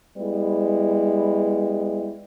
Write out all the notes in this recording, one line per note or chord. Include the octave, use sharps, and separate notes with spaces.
G3 G#3 B3 E4